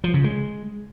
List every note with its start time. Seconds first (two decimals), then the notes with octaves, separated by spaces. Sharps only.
0.04 F3
0.14 C#3
0.24 G#3